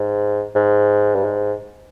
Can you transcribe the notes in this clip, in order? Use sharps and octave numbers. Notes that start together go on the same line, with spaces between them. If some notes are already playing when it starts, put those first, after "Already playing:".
Already playing: G#2
G#2
G2
G#2